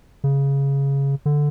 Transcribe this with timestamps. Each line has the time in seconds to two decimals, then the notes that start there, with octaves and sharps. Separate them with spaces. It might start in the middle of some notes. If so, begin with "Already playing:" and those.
0.24 C#3
1.26 D3